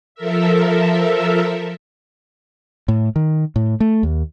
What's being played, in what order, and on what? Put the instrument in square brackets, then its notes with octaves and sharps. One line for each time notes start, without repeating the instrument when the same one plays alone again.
[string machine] F3 A4 A#4 E5
[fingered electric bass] A2
D#3
A2
A3
D#2